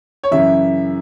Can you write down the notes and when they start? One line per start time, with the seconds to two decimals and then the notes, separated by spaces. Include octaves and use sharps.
0.24 C#5
0.31 F#2 C#3 E3 E5